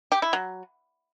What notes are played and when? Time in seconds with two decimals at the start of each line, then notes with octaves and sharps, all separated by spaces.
0.12 G4
0.22 E4
0.33 F#3